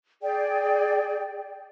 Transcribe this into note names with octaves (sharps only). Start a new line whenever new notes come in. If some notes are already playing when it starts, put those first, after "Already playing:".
G#4 D5 G5